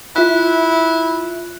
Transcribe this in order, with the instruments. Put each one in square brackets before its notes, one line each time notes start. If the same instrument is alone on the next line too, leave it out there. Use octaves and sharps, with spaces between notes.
[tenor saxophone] E4 [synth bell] F4 E5 F#6